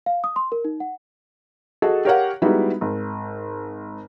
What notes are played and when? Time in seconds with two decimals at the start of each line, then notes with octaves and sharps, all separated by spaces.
0.06 F5
0.24 D#6
0.36 C6
0.52 A#4
0.65 D#4
0.80 F#5
1.82 F#4 G#4 A4 D#5
2.05 G4 A#4 C#5 F5 F#5
2.42 G3 G#3 B3 D#4 E4 F#4
2.81 G#1